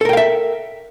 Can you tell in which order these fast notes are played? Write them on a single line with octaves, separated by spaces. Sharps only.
A4 A#4 G5 F5 E5